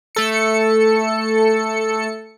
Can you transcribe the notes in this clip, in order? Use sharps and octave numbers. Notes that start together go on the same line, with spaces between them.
A3 A4 C#7